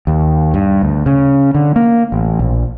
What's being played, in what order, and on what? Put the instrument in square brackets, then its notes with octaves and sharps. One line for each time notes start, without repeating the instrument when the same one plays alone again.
[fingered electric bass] D#2
G2
D2
C#3
D3
A#3
A1
A#1